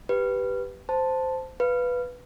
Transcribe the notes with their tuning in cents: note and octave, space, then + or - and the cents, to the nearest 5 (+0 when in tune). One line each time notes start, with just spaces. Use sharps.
G4 +0 B4 +0
C5 -10 A5 +0
B4 +0 F5 +0